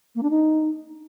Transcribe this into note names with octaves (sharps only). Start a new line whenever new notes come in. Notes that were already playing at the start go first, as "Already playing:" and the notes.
A#3
D4
D#4